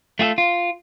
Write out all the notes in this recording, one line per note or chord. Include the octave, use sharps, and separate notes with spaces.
A3 F4 G#4 A4
F4